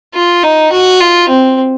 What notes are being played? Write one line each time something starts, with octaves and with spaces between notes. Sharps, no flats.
F4
D#4
F#4
F4
C4